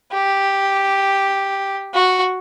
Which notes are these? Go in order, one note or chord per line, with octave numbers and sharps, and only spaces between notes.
G4
F#4